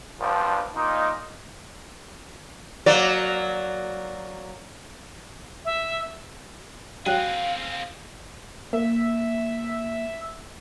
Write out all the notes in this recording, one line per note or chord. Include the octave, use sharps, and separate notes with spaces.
A#1 G2 F3
A#2 D#4
F#3 A#3 D5
E5
F#3 C4 D4 G#4 F5 G5 F#6
A#3 E5